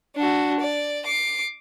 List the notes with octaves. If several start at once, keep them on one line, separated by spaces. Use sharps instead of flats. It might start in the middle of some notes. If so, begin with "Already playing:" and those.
D4 F#4
D5
D6 C7